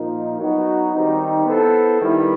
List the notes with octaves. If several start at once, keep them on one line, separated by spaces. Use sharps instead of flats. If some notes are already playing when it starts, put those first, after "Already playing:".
Already playing: A#2 F3 A#3 D#4
F#3 B3 D#4 F#4
D#3 G3 C4 D#4
B3 E4 A4 C5
D#3 G3 B3 E4